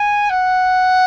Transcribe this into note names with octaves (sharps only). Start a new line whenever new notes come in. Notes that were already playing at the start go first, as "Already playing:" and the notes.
Already playing: G#5
F#5